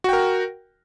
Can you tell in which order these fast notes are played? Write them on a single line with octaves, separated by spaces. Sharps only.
F#4 G5 A#4